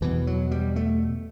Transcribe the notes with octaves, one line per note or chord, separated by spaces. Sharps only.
E2 B2 E3
F#3
G3
A3